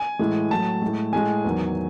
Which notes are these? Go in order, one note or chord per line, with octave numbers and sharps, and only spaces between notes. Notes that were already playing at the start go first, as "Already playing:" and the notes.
Already playing: G#5
A2 E3 G#3
A2 F#3 A5
A2 G#3
A2 G#3 G#5
E2 D#3 F#3